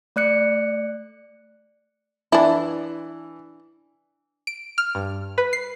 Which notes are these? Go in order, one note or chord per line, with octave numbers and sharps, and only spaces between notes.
A3 D5 F#6 C#7
E3 D4 E4
D7
F6
G2
B4
C7